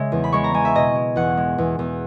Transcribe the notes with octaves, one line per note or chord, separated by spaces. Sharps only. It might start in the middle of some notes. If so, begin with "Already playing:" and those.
Already playing: C#3 G#3 E5
E2
B5
G#3 C#6
A#5
G#3 G#5
E5
B2 D#5
G#3
E2 F#5
G#3
E2
E2